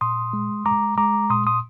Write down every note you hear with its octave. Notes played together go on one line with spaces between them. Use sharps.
A#2 C6 D#6
G#3
G#3 A#5 D6
G#3 A#5 D6
A#2 C6 D#6
C6 D#6